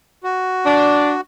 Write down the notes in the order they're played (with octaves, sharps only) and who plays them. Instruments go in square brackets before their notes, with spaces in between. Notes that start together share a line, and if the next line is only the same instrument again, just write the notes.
[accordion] F#4
[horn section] D4